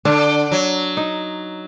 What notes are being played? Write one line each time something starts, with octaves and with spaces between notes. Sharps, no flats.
D3 D4
F#3
D#4